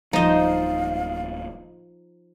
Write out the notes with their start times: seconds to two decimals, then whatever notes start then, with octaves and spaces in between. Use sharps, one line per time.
0.13 D1 F3 G3 D#4 C5 D#5 F5 A5